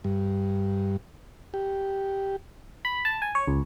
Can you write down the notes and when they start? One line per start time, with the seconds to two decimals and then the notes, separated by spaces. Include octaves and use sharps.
0.04 G2
1.54 G4
2.85 B5
3.05 A5
3.22 G#5
3.35 C#5
3.47 C#2